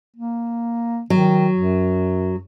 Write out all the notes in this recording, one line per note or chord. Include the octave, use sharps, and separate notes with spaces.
A#3
D#3 F#3
F#2